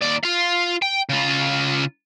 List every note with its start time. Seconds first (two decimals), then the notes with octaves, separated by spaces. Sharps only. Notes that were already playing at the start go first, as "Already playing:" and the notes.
0.01 D#2 D5
0.23 F4 F5
0.82 G5
1.09 C#3 F4